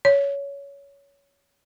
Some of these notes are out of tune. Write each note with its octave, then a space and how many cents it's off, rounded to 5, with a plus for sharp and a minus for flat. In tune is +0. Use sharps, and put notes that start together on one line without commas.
C#5 +15